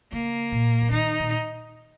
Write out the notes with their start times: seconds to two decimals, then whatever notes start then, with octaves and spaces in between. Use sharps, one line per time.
0.12 C#3 A#3
0.52 A#2
0.82 F3
0.91 D#3 D#4
1.19 A#2